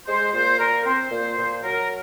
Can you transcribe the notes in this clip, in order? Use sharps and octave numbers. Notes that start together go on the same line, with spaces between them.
G#3 C5
A#2 C5
A#2 A#4
C4 C5
A#2
A#2
F#3 A#4